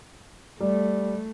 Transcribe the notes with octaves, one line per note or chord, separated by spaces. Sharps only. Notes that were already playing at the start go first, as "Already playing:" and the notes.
G3 A3